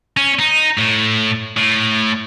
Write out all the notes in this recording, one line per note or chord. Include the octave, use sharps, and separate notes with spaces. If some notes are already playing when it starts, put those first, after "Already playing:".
C#4
D#4
A2
A2